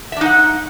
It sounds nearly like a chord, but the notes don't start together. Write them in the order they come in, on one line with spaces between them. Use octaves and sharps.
E5 D4 D#4 F#5